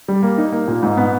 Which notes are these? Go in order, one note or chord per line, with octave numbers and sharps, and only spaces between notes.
G3
A#3
D#4
A#3
A#2
G#2
B3